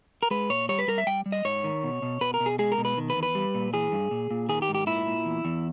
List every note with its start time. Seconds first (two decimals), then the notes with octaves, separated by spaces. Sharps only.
0.23 A#4
0.31 G#3 B4
0.50 A#2 C#5
0.69 G3 C#5
0.79 B4
0.88 G3 A#4
0.98 E5
1.07 G3 G5
1.26 G3
1.32 D#5
1.45 G#2 C#5
1.64 D#3
1.84 B2
2.02 B2
2.21 B2 B4
2.34 A#4
2.40 B2
2.46 G#4
2.59 G#3 G#4
2.72 A#4
2.78 B2
2.85 B4
2.97 D#3
3.10 B4
3.16 E2
3.23 B4
3.35 G3
3.54 A#2
3.73 E3 G#4
3.92 G2
4.11 A#2
4.31 A#2
4.49 D#3 G#4
4.62 G4
4.69 G#2
4.75 G4
4.87 A#2 E4
5.06 A#2
5.25 E2
5.45 E2